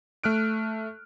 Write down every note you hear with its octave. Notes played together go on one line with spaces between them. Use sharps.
A3 F6 F#6 D7